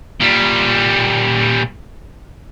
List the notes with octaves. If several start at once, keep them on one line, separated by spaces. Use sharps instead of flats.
A#2 G3